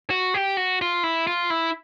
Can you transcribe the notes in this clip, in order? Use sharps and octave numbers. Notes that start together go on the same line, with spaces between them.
F#4
G4
F#4
F4
E4
F4
E4